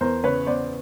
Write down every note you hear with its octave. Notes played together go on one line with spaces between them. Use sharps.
E2 A#4 C5
C#3 B4 C#5
B3 C5 D5